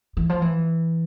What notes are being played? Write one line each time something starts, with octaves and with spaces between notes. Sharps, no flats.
E3
F3
E3